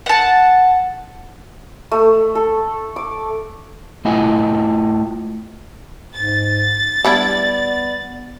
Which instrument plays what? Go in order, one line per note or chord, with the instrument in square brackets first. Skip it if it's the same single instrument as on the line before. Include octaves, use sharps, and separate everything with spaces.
[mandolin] F#5 A5
[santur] A3
A4
D6
[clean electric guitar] A3 E4 F4 D#5 F#5 G#5
[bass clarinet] G#2 [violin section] A6
[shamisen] G3 D4 E4 [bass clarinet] B3 [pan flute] D5